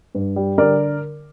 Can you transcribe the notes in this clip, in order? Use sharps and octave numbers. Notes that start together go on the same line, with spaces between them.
G2
G3
D3 A#4 D5